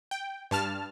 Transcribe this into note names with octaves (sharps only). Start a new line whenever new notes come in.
G5
G2 A5 F6